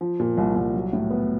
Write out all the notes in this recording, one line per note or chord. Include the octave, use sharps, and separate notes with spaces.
F3
A#2
C2
C2
F#3
A2
B3